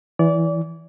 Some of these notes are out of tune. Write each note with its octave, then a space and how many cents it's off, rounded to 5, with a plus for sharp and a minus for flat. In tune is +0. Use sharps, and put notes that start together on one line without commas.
E3 +0 D5 -30